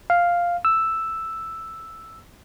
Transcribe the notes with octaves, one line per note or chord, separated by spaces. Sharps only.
F5
E6